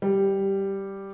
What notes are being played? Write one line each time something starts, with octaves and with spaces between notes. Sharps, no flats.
G3